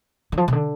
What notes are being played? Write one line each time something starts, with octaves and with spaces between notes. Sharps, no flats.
D3
F3
C3
D3